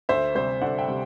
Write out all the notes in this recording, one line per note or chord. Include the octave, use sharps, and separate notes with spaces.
D2 C5 E5
C3 G3 C5
D2 D5 F#5
E5 G5
C3 G3